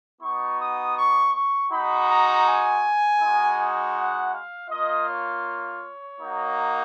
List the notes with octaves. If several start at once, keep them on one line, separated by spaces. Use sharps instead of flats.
B3 D#4 F#4 C#6
D#6
C#6
C#6
G#3 D#4 F#4 B5
A#5
G#5
G#3 D#4 F#4
F#5
F5
A#3 F4 D#5
C#5
A#3 D#4 F#4